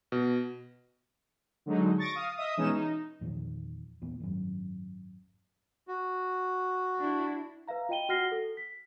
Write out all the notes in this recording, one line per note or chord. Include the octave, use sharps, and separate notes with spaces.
B2
D3 F#3 G#3 D#4
C#6 A6 A#6 D7
F5 D#6
D#5 E5 D#6
B2 E3 G#3 C#4 D#4 E7
D#4
E2 A#2 D#3 F3
E2 A#2
G#1 F#2
F#4
D4 E4
B4 E5 F5 A#5
F4 D#5 G5 D#7 G7
F#4 F#5 F6 A#6 C7 G7
A4
B6